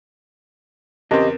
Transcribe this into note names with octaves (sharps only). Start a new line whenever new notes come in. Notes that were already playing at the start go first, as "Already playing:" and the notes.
E2 C#3 C4 G4 A#4 D#5